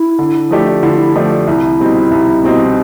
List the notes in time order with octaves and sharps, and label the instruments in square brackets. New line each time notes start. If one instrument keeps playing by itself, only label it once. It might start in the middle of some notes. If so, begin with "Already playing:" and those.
Already playing: [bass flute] E4
[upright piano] D3
F3 A3 D4 G4
[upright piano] D3 [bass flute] E4
[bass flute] F4
E4
[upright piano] F3 A3 D4 G4
[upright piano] C2 [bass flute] E4
[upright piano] B2 G3 C4 D#4
C2
B2 G3 C4 D#4